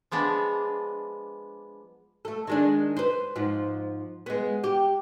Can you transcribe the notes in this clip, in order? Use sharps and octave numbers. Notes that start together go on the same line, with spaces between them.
F3 G#3 B3 D4
A3 A4
D#3 G#3 D4
B4 C5
G#2 F3
G#3 B3
G4